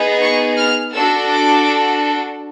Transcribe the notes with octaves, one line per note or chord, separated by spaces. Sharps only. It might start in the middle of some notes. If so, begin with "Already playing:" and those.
Already playing: B3 D#4 G#4
C#6
F6
D4 F#4 A4 E6
D6